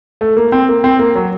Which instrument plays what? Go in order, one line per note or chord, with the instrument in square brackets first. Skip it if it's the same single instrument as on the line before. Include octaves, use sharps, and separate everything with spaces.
[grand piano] A3
A#3
C4
A#3
C4
A#3
F#3